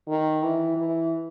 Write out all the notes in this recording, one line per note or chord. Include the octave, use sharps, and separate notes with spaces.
D#3
E3
E3